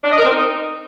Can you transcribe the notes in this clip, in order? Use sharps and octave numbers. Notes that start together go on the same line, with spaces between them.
D4
D#5
A#4
C4
D#4